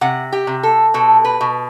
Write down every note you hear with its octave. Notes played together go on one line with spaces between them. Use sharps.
C3 F#5
G4
C3
A4
B2 A4
B4
B2